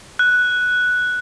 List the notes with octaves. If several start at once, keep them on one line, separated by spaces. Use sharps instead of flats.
F#6